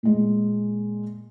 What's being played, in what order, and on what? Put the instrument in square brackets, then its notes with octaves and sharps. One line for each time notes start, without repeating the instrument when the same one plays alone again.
[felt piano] A#2 G#3